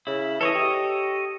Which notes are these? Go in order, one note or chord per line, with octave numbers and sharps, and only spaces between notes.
C#3 E4
E3 A4 C#5 D#5
G4